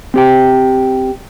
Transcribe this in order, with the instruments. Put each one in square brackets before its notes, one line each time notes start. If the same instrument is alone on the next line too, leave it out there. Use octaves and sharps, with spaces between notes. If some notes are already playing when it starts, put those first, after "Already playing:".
[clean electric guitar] C4 G4 G5